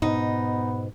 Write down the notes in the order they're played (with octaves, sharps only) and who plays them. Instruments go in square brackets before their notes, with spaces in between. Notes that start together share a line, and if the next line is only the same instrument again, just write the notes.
[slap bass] G#2 B2 [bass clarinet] B3 [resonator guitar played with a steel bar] D#4